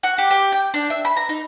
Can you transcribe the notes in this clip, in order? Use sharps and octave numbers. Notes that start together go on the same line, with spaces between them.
F#4
G4
G4
G5
D4
E5
B5
A#5
D#4